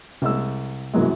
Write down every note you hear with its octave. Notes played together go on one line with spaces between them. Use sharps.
C2 G#3 E6
C2 F#2 B2 E3 F#3 G#3